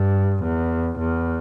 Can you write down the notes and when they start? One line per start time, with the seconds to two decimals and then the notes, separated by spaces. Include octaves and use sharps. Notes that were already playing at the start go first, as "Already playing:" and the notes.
Already playing: G2
0.43 E2
0.99 E2